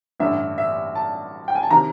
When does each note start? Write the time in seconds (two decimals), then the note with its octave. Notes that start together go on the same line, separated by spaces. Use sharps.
0.20 A1 G2 D3 E5
0.58 E5
0.95 A5
1.48 G5
1.55 G#5
1.63 A5
1.71 C3 D#3 A#5